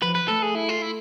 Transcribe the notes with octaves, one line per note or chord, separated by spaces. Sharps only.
F3 B4
B4
A3 A4
G#4
E4
F4
E4